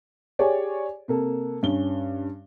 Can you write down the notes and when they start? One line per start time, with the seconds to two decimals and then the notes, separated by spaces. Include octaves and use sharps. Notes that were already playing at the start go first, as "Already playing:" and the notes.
0.39 G4 G#4 C#5 D5 G#5
1.08 C3 A#3 A4
1.63 G2 C#4 G7